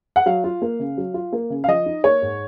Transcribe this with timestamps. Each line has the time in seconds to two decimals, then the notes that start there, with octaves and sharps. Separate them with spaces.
0.16 F#5
0.26 F#3 F5
0.44 F4
0.62 A#3
0.80 C#3
0.97 F#3
1.14 F4
1.33 A#3
1.50 C#3
1.64 F5
1.68 F3 D#5
1.86 D#4
2.03 A#3 C#5
2.22 G#2